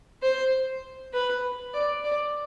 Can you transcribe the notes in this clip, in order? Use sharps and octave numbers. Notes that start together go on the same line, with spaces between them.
C5
B4
D5
D5